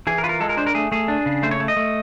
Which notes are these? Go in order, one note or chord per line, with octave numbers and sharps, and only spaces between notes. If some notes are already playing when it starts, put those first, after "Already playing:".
E3 G#4
A#4
F4 B4
A#4
G#3 A4
A#4
D4 C5
A#4
A3 G#4
A3 G#4
D4
C#3
A3 C5
C#5
A3
D#5
A3